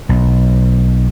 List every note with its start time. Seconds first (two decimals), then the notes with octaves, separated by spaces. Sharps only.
0.09 B1